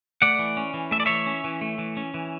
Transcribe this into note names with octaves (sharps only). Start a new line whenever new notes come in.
A3 D5 F#5
E3
C#4
E3
A3 E5
D5
E3 C#5 E5
C#4
E3
A3
E3
C#4
E3